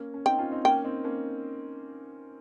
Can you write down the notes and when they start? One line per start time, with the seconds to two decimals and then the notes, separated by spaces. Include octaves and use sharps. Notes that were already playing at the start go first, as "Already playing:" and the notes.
Already playing: A#3 C#4
0.14 C#4
0.26 C4 D#4 G5
0.39 C#4 F4
0.51 C4 D#4
0.65 A#3 C#4 G5
0.84 C4 D#4
1.04 A#3 C#4